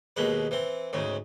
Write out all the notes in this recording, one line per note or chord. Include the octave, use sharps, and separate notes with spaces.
D#2 B2 G#3 B4
E3 C4
D2 G#2 C#3